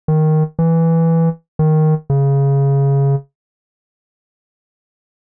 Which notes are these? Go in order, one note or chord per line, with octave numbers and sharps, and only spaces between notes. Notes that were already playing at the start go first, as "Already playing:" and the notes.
D#3
E3
D#3
C#3